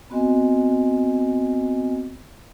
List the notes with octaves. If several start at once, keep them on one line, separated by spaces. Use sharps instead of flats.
B3 C4 F#4 D#5 G#5